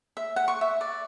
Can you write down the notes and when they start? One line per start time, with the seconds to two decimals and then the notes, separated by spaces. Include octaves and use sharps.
0.17 E5
0.36 F#5
0.48 C#6
0.61 E5
0.81 D5